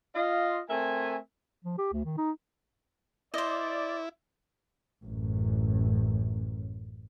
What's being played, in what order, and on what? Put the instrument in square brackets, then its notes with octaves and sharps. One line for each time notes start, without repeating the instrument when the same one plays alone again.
[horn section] F4 D#5 F5
A3 C4 A#4 E5 G#5
[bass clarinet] F3
G4
D2
D#3
D#4
[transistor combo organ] E4 [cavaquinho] C5 D#5 [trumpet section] D5
[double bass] A1 F#2